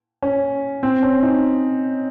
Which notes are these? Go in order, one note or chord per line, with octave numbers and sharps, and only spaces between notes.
C#4
C4
C#4
D#4